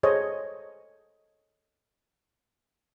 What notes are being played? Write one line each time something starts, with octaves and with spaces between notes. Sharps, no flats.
G#4 A4 C5 C#5 D#5